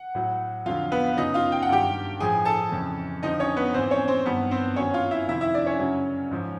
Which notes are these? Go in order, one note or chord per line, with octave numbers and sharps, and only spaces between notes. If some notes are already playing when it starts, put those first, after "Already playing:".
Already playing: F#5
A2 F#3
F2 D3 F#3 F4 F5
B3 B4
F#2 C#3 F#3 D#4 D#5
F4 F5
G5
F#5
G2 D#3 F#3 G4 G5
A2 F3 G#4 G#5
A4 A5
F2 C#3 E3
F2 D3 F3 D#4 D#5
C#4 C#5
B3 B4
G#2 E3 C4 C5
C#4 C#5
C4 C5
G2 D#3 F#3 B3 B4
C4 C5
F#2 D#3 F#3 C#4 C#5
F4 F5
E4 E5
F2 C3 D#3 E4 E5
E4 E5
D4 D5
C#4 C#5
F#2 C#3 F#3
G#2 F3